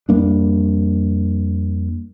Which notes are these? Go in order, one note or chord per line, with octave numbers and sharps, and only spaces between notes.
F2 G3 A#3 D4